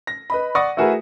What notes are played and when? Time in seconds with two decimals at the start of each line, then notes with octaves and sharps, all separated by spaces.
0.07 A#6
0.30 B4 D#5 B5
0.55 D5 F#5 C#6 D#6 A#6
0.77 A3 E4 F#4 G#4 A#4 B4